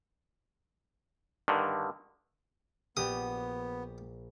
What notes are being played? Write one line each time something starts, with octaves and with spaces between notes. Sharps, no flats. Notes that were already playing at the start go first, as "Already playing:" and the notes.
G2 D3 D#3
A#1 B3 F#4 G4 D5 D#6